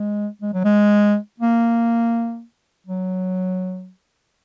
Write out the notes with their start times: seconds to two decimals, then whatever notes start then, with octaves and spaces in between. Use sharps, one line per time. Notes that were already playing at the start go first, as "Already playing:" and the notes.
Already playing: G#3
0.42 G#3
0.54 F#3
0.64 G#3
1.40 A#3
2.87 F#3